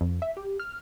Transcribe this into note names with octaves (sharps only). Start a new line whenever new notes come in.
F2
E5
G4
F6